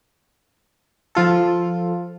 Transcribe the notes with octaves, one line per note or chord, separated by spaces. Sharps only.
F3 F4 A4